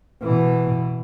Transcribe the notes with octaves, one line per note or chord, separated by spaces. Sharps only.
B2 E3